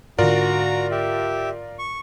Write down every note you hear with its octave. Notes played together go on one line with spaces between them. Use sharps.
G#2 D3 F4 F#4 A#4 D5 A#5
G4 E5
C#6